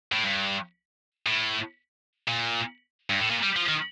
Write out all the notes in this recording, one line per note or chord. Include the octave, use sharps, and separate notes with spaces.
A2
G2
A2
A#2
G2
A2
A#2
G3
F3
D#3